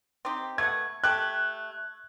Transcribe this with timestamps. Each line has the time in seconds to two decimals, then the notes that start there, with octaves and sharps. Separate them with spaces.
0.25 C4 D#4 G4
0.58 A3 B3 F#5 G#6
1.04 A3 G4 A4 F#6